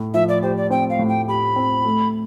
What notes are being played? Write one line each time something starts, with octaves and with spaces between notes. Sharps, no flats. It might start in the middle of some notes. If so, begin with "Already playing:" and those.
Already playing: A2
F3 E5
D5
G4 C5
D5
C4 G5
F5
A2
G5
G4 B5
C4
A3